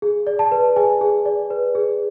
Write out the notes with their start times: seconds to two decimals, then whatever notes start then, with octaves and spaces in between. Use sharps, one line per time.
0.02 G#4
0.27 D5
0.39 A5
0.52 B4
0.76 G#4 G#5
1.01 G#4
1.26 D5
1.50 B4
1.75 G#4